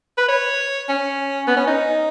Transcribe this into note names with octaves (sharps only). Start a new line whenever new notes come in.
B4
C#5
C#4
B3
C#4
D#4